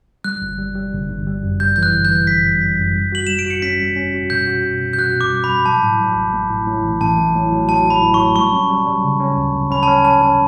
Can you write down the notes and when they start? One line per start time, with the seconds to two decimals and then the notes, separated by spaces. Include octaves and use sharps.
0.24 G3 F#6
0.42 G1
0.58 G3
0.75 G3
0.93 G1
1.10 G1
1.27 G3
1.43 F#2
1.60 G3 G6
1.76 E3 G6
1.83 F#6
1.94 G1
2.05 G6
2.11 E3
2.27 G1 B6
2.44 G3
2.62 G3
2.79 F#2
2.95 G3
3.12 F#4 F#7
3.27 G3 E7
3.39 D7
3.46 F#4 C#7
3.62 C#4 B6
3.79 G3
3.96 C#4
4.14 F#4
4.30 B2 G6
4.47 F#4
4.64 B2
4.81 B2
4.93 G6
4.98 F#4 F#6
5.16 B2 D6
5.32 G3
5.44 B5
5.49 G3
5.66 F#3 A5
5.82 A2
5.99 F#3
6.16 A1
6.33 A3
6.50 A2
6.67 A2
6.83 A1
7.00 A1 A5
7.17 A3
7.35 A2
7.52 F#3
7.69 F#3 A5
7.85 F#3
7.90 B5
8.03 A2
8.14 F#3 C#6
8.36 G3 C#6
8.53 C#4
8.70 G3
8.86 G3
9.04 C#3
9.20 C#4
9.37 D2
9.54 D2
9.71 C#4 B5
9.83 C#4 A5
10.04 C#4 A5
10.22 C#4